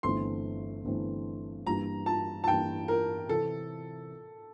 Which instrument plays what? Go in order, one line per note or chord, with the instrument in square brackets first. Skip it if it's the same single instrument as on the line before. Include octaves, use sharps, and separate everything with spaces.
[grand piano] G1 G2 E3 A3 C4 [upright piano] C6
[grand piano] G1 G2 E3 A3 C4
[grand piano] G2 E3 G3 A#3 [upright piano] A#5
[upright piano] A5
A5
[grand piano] G2 E3 G3 A#3 [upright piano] G5
[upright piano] A#4
[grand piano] C3 E3 [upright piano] A4